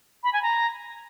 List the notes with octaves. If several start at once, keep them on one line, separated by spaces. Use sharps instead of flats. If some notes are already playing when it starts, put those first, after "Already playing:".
B5
G#5
A#5